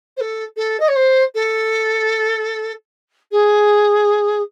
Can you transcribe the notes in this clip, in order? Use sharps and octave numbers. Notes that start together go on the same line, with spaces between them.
C5
A4
A4
D#5
C#5
C5
A4
G#4